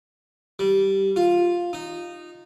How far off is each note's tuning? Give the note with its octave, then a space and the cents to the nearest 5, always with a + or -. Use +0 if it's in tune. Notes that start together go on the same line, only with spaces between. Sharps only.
G3 -10
F4 +5
D#4 -15